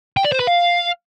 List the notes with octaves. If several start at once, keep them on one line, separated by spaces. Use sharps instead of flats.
G5
D5
C5
B4
F5